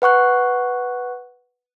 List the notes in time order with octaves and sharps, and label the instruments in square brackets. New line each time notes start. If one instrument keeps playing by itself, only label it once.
[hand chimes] B4 F#5 C#6 F#6